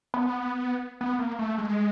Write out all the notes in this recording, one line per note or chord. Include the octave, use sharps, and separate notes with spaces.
B3
B3
A#3
A3
G#3